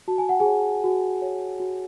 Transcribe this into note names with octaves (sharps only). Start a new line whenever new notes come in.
F#4 A5
G#5
F#5
G#4 G#5
C#5
F#4
C#5
F#4